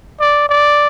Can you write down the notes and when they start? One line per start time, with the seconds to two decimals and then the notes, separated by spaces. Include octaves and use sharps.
0.20 D5
0.49 D5